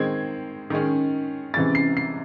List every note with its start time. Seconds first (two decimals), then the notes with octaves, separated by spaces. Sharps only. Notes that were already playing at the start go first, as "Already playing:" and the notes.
Already playing: D#3 G#3 C4 G#6
0.70 D#3 G#3 C#4
1.54 C3 E3 G#3 C#4 A6
1.75 C7
1.97 C7